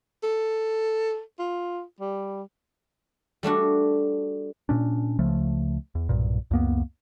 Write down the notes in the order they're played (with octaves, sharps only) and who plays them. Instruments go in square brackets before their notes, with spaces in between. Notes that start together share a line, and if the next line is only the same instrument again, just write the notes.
[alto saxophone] A4
F4
G3
[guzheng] G3 A3 D4 F#4
[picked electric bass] A#2 C#4 D4
C#2 C#3 F3 A3
E2
B1 G2 A#2
C#2 F#2 A#3 B3